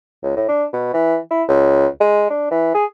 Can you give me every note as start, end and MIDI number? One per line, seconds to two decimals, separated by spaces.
0.23 0.34 37
0.36 0.45 45
0.48 0.64 62
0.73 0.91 47
0.94 1.17 52
1.31 1.43 64
1.48 1.87 37
2.00 2.29 56
2.30 2.51 62
2.51 2.70 52
2.74 2.85 68